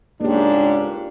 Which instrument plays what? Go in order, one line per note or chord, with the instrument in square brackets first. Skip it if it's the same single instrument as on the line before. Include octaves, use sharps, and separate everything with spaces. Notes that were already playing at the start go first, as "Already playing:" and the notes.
[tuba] C#2 [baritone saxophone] G#2 [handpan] A#3 G4 [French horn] D4